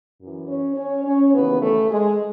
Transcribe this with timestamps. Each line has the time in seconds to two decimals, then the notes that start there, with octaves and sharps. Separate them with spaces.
0.18 F#2 E3
0.48 C#4 C#5
0.76 C#4 C#5
1.04 C#4 C#5
1.34 D#2 C#3 E3 B3 B4
1.62 A3 A4
1.91 G#3 G#4